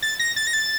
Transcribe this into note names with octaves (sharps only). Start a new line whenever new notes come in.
A6
A#6
A6
A#6
A6